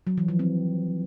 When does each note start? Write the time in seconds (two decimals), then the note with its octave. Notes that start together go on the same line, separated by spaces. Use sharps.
0.07 F#3
0.18 E3
0.28 F3
0.39 C4